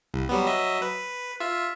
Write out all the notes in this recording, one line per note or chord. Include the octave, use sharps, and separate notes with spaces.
C2
F#3 G3 B3
F#3 D#5 E5
B4
F4 E5